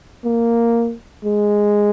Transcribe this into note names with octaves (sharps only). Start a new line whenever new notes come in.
A#3
G#3